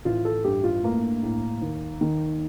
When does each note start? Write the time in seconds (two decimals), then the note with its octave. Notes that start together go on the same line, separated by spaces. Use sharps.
0.05 A1 F4
0.25 A4
0.44 G2 G4
0.64 F4
0.83 A3 A#3
1.23 A2
1.61 D#2
2.01 D#3